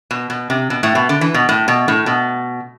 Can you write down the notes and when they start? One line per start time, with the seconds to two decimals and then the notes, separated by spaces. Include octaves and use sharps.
0.11 B2
0.30 B2
0.50 C3
0.70 B2
0.83 A2
0.95 B2
1.09 D3
1.21 E3
1.34 B2
1.49 A2
1.68 B2
1.88 A2
2.06 B2